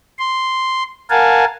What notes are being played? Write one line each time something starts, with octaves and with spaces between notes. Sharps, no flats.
C6
A#4 F5 F#5 G#5 A5